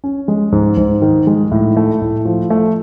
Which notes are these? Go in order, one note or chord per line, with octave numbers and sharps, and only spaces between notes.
C#4
G#3
G#2
G#2
D#3
G#3
A2
A3
A2
F3
A3